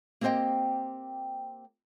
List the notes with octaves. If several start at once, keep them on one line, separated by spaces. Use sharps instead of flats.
A#3 C4 G4 C5 D#5 G5